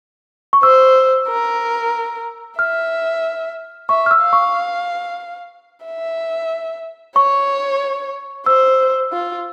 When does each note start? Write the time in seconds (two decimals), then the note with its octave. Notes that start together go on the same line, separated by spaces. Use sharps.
0.53 C#6
0.62 C5 E6
1.28 A#4
2.59 E5 F6
3.89 E5 C#6
4.06 F6
4.11 E6
4.22 F5
4.33 C#6
5.85 E5
7.16 C#5 C#6
8.46 C5 E6
9.12 F4